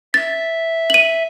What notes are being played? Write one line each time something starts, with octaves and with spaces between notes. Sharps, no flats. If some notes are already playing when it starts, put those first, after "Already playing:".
E5 A6
D#7 F#7